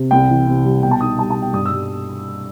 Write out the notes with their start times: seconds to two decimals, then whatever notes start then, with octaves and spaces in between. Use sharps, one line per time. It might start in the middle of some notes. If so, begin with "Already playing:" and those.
Already playing: C3
0.11 C2 G5
0.29 E3
0.47 C3
0.65 G3
0.83 B2 G5
0.91 A5
1.00 D#4 D#6
1.18 G3 A5
1.30 A5
1.37 B2
1.42 G5
1.53 G2 D#6
1.66 E6
1.72 G3